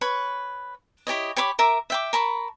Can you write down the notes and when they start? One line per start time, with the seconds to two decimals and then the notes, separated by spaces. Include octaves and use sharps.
0.01 B4 C#5 B5 C#6
1.07 E4 G4 C#5 D#5
1.36 G4 C#5 B5 D6
1.59 A#4 E5 A#5 D6
1.90 E5 G5 D6
2.13 A#4 A5 B5 C#6